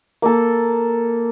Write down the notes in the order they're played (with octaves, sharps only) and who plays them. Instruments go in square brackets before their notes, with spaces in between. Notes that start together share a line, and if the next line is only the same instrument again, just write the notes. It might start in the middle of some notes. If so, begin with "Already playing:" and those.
[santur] A#3 A4